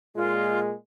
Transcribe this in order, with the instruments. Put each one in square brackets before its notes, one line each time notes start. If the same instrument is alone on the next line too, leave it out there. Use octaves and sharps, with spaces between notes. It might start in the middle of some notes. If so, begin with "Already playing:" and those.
[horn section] A#2 G#3 [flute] F4